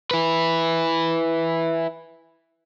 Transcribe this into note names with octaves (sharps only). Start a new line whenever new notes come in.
E4 B4